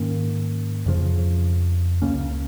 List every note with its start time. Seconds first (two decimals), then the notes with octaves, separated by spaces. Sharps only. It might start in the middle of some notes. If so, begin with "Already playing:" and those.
Already playing: G#2 D#3 A#3 C#4
0.86 F2 C#3 F3
2.02 C#2 C#3 A#3 C#4